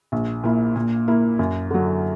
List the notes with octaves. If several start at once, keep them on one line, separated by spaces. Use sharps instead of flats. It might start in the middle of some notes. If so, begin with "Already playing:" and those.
A#1
A#2 A#3 E4
A#2
A#3 E4
F#2
D3 F#3